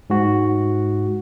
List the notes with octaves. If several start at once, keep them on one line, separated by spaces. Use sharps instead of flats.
G#2 F#4